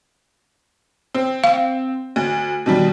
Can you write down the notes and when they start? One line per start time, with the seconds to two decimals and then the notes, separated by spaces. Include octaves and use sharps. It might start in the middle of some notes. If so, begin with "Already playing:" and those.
1.14 C4
1.44 F5
2.16 D2
2.66 B2 D#3 G3